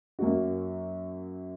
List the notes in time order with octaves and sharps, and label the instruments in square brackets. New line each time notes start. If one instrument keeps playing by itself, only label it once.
[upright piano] F#2 F#3 A#3 F#4